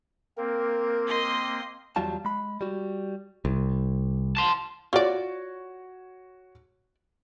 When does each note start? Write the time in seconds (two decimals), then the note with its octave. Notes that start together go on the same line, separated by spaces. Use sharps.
0.38 A#3 C4 A#4
1.07 D#5 C6
1.96 E2 F#3 G3 F4 A5
2.25 G#3 B5
2.61 G3 F#4
3.45 C2
4.37 A5 C6
4.93 F4 F#4 C#5 D5